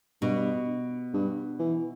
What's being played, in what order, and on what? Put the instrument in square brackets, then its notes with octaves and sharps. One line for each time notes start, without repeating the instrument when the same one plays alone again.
[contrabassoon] G2 [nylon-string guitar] B2
[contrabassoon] G2
E3